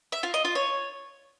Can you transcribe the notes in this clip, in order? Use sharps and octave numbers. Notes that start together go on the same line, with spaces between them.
E5
F4
D#5
F4
C#5